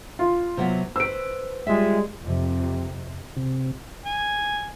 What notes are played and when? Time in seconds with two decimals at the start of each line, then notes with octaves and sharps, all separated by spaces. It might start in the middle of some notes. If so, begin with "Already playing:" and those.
0.19 F4
0.57 C3 F#3 B3
0.96 B4 C5 E6 D7
1.67 G3 G#3 F4 E5
2.23 F2 C3
3.37 C3
4.05 G#5